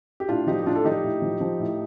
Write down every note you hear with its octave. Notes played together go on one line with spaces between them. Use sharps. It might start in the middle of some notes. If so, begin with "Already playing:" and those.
G4
A2 D4 F4
F3 D#4 G4
G4
A2 D4 F4
A4
F3 D#4 G4
A2
F3
F3
A2